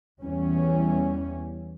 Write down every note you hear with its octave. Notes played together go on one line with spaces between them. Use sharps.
E2 E3 G3 C#4